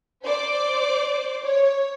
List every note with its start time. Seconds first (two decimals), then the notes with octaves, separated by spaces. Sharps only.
0.24 C5 D5 D6
1.43 C#5